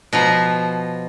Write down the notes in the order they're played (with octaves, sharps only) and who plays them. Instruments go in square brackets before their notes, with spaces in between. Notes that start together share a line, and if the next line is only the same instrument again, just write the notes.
[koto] B2 F3 A#5